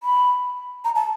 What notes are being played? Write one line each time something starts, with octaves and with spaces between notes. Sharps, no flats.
B5
A#5
A5